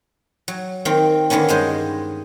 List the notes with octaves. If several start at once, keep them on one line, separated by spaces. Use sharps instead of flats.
F#3
D#3 A#3 C4
D3 D#3 A#3 B3 C#4
G2 G#3 C5 D#5